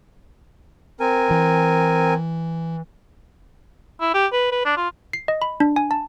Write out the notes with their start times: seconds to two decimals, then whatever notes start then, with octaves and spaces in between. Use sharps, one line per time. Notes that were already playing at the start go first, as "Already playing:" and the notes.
1.00 C4 A#4 G#5
1.31 E3
4.00 E4
4.14 G4
4.32 B4
4.52 B4
4.65 D4
4.77 F4
5.13 C7
5.28 D#5
5.42 B5
5.60 D4
5.76 G#5
5.91 A5